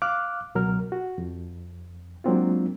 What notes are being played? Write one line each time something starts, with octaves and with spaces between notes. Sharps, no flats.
F5 D6 F6 F#6
C#2 B2 F#3 A#4 F6
F#4
F2
F#3 G#3 A#3 C4 D4 F4